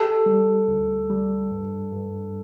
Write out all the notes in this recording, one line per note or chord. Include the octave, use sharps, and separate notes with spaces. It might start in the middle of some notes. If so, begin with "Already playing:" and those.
Already playing: G4 A4
G3
D2
G3
G2
G2